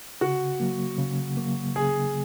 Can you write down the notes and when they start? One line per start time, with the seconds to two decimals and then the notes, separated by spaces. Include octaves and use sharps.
0.21 C#3 F#4
0.60 F#3 A#3
0.98 C#3
1.37 F#3 A#3
1.75 C#3 G#4